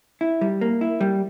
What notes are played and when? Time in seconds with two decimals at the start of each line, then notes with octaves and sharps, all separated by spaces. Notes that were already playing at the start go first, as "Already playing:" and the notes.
0.21 E4
0.41 G3
0.61 A#3
0.81 E4
1.01 G3